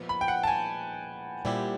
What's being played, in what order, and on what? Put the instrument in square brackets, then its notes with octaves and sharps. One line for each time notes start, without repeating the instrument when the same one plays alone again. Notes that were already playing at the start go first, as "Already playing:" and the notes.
Already playing: [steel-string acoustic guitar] A#2 F3 G#3 B3
[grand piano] B5
G5
F#5
A5
G#5
[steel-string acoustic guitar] A#2 G3 C4 E4 G4